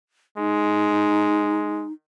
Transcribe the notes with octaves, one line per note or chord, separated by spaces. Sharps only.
G#3 D#4